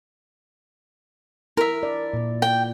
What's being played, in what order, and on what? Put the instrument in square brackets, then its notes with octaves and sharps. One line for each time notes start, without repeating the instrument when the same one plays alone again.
[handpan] E4 [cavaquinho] A#4 E5
[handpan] D5
A#2
[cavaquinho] G5